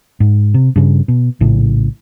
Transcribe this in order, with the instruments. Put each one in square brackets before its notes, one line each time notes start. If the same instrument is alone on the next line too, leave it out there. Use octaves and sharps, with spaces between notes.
[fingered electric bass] G#2
C3
G2 C#3
B2
A#1 A2 C#3